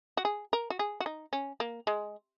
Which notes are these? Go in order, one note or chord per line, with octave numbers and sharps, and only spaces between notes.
F#4
G#4
A#4
F#4
G#4
F#4
D#4
C#4
A#3
G#3